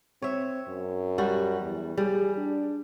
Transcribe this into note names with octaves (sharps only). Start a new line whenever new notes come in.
C4 C#5 E5
F#2
G3 F#4
E2
G3 G#4
D4